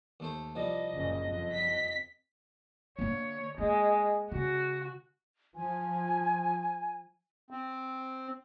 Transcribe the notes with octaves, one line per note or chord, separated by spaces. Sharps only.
D#2 A3 C5
C2 F3 G3 D#5
F#1 A#2 C#3
F2
B6
D3 A#3 C#5
G#3 A#3
C#3 F#4
F3 G#5
C4